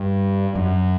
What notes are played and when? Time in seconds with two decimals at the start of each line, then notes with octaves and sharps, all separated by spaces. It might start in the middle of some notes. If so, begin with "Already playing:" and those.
Already playing: G2
0.55 F#2